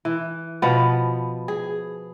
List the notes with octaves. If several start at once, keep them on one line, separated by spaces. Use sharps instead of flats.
E3
B2 F3 B3
G#4